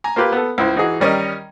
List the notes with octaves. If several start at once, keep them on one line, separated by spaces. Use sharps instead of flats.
G#5 A#5
A#3 F4 G4 B4
B3 A4
C#2 E4 C5
E3 D#4 F#4 G#4 D#6
D#3 G3 C#4 A#4 D#5